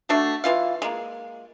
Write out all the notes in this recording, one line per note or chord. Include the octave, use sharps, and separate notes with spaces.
A3 D4 F#4
E3 F4 F5
G#3 A#3